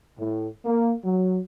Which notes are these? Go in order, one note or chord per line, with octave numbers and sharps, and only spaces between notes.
A2
A#3
F#3